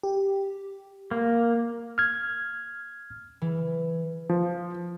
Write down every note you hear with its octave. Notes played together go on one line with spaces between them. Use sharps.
G4
A#3
F6 G#6
E3
F3